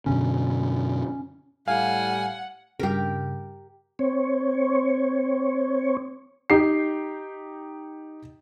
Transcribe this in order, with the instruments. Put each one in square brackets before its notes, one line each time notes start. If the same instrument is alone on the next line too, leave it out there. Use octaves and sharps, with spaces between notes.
[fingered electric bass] F#2 B2 D3 [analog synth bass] C#4
[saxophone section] A2 G3 [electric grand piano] F5 [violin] F#5 [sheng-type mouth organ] G#5
[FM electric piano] G2 C#3 [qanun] G4 A#4
[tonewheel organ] C4 C#5
[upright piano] D#4 G4 C7